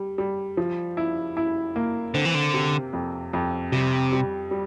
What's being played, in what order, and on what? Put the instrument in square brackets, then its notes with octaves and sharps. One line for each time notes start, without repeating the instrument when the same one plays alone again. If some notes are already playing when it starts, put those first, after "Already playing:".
Already playing: [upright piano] G3
G3
F3
E4
E4
A#3
[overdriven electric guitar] D3 [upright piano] C4
[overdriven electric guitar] E3
D3
[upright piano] C3
F2
F2
[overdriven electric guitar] C3 [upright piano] G3
[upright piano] G3
G3